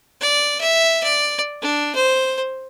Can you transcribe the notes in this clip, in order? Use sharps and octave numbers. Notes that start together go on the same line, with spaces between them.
D5
E5
D5
D4
C5